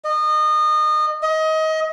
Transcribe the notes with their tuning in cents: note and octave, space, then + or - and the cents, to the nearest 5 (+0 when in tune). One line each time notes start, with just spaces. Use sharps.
D#5 -30
D#5 +25